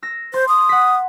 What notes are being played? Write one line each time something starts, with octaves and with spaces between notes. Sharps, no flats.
E6 A#6
C5 C6 A6
D#6
F#5 B6